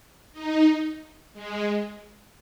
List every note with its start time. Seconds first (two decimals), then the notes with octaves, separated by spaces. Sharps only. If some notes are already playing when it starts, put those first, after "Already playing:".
0.32 D#4
1.33 G#3